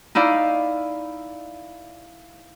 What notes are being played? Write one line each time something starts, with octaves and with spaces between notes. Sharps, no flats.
D#4 E4 D5 F5